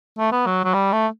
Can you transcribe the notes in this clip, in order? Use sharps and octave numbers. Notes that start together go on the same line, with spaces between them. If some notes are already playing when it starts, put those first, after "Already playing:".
A3
B3
F#3
F#3
G3
A3